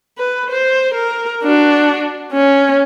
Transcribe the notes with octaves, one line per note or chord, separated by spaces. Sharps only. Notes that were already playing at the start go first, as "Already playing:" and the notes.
B4
C5
A#4
D4 F#4
C#4